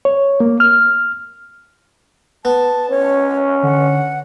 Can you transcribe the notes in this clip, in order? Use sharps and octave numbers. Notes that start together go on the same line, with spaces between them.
C#5
A#3
F6
B3 A5
C#4 C#5
D3 F#5